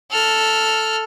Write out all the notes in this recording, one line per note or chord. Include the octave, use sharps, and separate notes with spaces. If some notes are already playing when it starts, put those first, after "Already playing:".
A4 F6